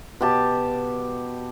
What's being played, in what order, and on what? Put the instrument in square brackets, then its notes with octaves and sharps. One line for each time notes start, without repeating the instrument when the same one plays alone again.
[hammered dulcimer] B2 G4 A5